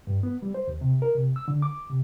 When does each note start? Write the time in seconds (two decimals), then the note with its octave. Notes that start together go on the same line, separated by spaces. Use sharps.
0.07 G2
0.23 B3
0.42 G3
0.54 C5
0.68 D#2
0.81 C3
1.02 A#4
1.15 C3
1.36 E6
1.48 D3
1.62 D6
1.90 C3